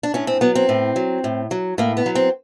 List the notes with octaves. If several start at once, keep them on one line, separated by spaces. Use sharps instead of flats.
D4
A2 C#4
C4
F#3 B3
C4
A2
F#3
A2
F#3
A2 A#3
B3
F#3
C4